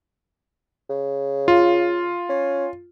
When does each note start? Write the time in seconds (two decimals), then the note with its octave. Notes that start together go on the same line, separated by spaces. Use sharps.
0.90 C#3
1.48 F4
2.29 C#4